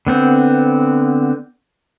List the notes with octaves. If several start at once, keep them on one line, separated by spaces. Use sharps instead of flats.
D3 B3 C4